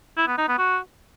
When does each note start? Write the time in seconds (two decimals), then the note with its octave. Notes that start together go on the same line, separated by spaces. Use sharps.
0.17 E4
0.27 B3
0.38 D#4
0.48 B3
0.58 F#4